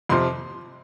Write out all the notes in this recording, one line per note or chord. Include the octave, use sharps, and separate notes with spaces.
F2 C3 F3 C6